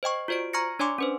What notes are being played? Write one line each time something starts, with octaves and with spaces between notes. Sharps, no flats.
C5 D#5 G5 C#6
F4 F#4 C5 D5 D7
A#5 C#6 F6 G#6 A#6 C#7
D4 C#5 D5 G#5 C6 D6
C#4 B4 C5